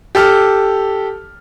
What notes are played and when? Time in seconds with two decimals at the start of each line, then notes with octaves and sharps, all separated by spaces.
0.15 G4 A4 F6